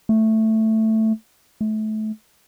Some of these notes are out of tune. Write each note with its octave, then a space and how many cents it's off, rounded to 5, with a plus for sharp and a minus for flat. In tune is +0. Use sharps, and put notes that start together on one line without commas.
A3 +5
A3 -25